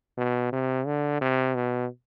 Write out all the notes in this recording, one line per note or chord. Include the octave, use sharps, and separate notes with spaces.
B2
C3
D3
C3
B2